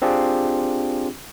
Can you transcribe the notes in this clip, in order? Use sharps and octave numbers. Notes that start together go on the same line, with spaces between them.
C4 D4 F4 G4 G#4